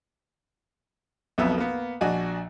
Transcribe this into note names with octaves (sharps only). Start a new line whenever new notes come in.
B1 F2 B2 B3 E5 E6
A#3 B3
A#1 D4 F#4 D#5 G#5